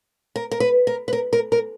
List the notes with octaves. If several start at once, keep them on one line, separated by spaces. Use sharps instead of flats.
A#4
A#4
B4
A#4
B4
A#4
A#4
A#4